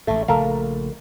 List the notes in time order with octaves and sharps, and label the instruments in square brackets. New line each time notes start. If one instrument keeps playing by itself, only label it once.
[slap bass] A1 G#2 [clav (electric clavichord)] A3
[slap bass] A#1 C#3 A3 [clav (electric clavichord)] A4 A#4 F5